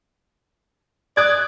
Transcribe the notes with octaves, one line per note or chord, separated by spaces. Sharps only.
D5 D#6 F#6 G#6